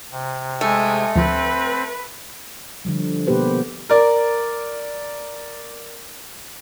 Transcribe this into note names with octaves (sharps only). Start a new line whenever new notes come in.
C3
G#3 A3 G#5
D2 F3 C4 B4
D3 F3 G3
B2 A#3 B3 G4 B4 C5
A#4 D5